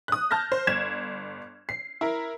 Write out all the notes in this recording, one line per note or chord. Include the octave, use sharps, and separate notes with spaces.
D#6 F#6
A5 F6 G6 A#6
C5
G1 G#6 E7
C7
E4 A#4